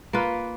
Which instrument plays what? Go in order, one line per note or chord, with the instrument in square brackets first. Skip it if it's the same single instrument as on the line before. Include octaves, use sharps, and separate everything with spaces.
[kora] A#3 F4 B4